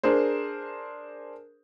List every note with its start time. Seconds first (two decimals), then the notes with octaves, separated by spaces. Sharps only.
0.03 D4 G#4 A#4 C5